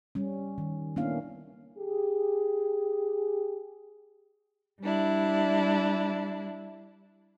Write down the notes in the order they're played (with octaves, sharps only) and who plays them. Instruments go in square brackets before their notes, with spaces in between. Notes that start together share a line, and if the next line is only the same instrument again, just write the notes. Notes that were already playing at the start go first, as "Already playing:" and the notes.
[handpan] G3 C#4
D#3
A#3 B3 C#4 D4 E4 F5
[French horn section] G4 G#4
[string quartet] G3 D4 E4